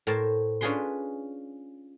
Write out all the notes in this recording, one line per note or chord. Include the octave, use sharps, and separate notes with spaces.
A2 A#4 C5 A5
C#4 D4 F4 G#4 B4 C6